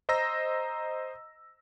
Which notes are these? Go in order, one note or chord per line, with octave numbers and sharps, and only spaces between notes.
C5 D#5 A#5 E6 A#6